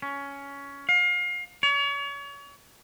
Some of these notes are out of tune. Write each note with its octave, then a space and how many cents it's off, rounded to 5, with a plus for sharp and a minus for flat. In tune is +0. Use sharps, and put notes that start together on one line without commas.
C#4 +15
F5 +30
C#5 +35